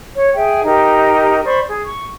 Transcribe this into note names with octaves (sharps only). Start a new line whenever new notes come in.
C#5
G#4 E5 G5
D#4 G4 A#4
C5 D5 B5 C#6
G#4
C#6